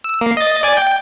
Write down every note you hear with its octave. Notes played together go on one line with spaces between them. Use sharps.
E6
A#3 C7
D#5 A6
D5 G#5 A6
G5